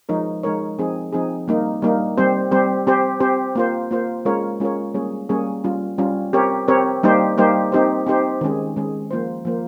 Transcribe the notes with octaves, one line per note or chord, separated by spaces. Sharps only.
F3 G#3 D#4 A#4 C#5
F3 G#3 D#4 A#4 C#5
F3 C4 D#4 G#4
F3 C4 D#4 G#4
G3 A#3 D#4
G3 A#3 D#4
G3 C4 G4 C5
G3 C4 G4 C5
C4 G4 C5
C4 G4 C5
A#3 F4 C5
A#3 F4 C5
G#3 C#4 F4 A#4 C#5
G#3 C#4 F4 A#4 C#5
G3 A#3 C#4 G#4 C#5
G3 A#3 C#4 G#4 C#5
G3 C#4 F4
G3 C#4 F4
C4 G4 A#4 C#5
C4 G4 A#4 C#5
G3 A#3 D#4 G4 C5
G3 A#3 D#4 G4 C5
C4 D#4 G4 C5
C4 D#4 G4 C5
D#3 G#3 C#4 G#4
D#3 G#3 C#4 G#4
F3 A#3 F4 C5
F3 A#3 F4 C5